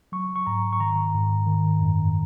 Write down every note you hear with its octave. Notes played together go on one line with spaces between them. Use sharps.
F#3 C#6
C#6
G#2 A#5
C#6
D#3 A#5
G#2
D#3
F#2